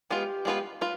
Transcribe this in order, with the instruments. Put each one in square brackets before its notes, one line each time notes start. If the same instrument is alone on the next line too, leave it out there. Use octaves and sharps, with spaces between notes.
[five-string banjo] G#3 B3 F4 B4 [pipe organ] G4
[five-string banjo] G#3 B3 F4 B4
F4 B4